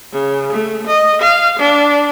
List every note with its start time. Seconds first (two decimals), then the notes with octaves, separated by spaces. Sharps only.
0.11 C#3
0.51 A3
0.86 D#5
1.20 F5
1.58 D4